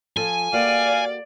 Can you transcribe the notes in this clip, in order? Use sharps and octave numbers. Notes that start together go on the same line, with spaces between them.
F3 A4 G#5
A#3 F#4 G4 D5 F5